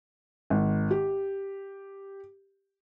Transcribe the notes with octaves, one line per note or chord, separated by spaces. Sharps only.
G#1
G4